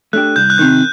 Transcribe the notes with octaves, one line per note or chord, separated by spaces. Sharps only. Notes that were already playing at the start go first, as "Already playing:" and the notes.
A3 D4 G4 F#6
C2 G6
F#6
C3 D#3 G6